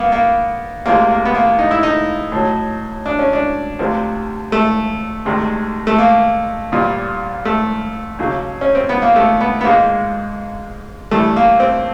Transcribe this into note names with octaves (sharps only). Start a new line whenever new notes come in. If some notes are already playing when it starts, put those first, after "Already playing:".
Already playing: A#3 B3
A#3
D2 C3 F3 G#3 A#3
A#3
B3
A#3
D#4
E4
D#4
A2 F#3
D4
C#4
D4
D2 C3 F3
A3
D2 C3 D#3 G#3
A3
A#3
C2 A#2 G3
A3
D#2 C#3 F#3
C#4
C4
B3
A#3
A3
B3
B3
G#2 F3 G#3 A#3
G2 E3 G3 A3
A#3
C4